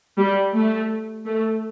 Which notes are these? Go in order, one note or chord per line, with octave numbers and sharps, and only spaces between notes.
G3
A3
A3